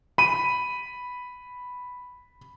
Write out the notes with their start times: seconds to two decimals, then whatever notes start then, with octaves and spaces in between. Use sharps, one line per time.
0.18 B5 D#7